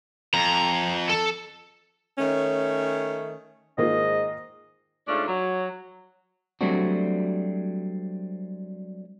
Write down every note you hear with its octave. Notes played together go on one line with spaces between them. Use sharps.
F2 A#5
A4
D#3 A3 C#4
G#2 D#3 A#3 F4 D#5
G#2 A3 C#4 D4 F4
F#3
F#3 G3 A3 C4 D4 F#4